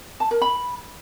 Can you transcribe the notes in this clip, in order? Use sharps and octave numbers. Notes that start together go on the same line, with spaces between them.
A5
A#4
B5